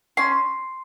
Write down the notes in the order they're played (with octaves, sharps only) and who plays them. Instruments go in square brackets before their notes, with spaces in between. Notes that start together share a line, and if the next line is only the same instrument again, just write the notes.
[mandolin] C#4 C6